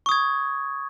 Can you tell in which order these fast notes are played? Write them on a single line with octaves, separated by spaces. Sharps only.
C#6 D#6 G#6